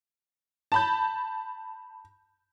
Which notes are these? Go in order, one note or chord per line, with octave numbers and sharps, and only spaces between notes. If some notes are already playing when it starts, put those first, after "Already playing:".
A5 B5 G6